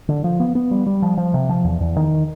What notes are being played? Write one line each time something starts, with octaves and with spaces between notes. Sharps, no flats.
D3
F3
B3
B3
G3
G3
F3
F3
C3
F3
E2
E2
D#3